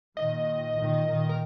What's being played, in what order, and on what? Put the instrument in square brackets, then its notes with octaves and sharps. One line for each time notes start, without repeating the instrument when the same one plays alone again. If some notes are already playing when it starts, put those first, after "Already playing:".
[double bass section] A#2 D#3 [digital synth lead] D#5
[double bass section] A#2 D#3
A#2 D#3
[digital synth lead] A#4